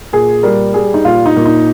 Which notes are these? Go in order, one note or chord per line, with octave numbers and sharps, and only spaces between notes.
A#2 G#4
G3 A#4
G3 G#4
D#4
A#2 F4
D#4
A#2
D#4